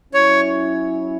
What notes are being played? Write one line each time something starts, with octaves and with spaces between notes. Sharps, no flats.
F#3 C#4 E4 C#5